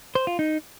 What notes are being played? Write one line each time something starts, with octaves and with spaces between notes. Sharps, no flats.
C5
F4
D#4